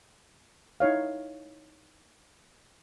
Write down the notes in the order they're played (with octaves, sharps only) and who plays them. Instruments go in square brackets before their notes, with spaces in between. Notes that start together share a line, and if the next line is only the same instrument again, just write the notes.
[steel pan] D#4 E4 C#5 F5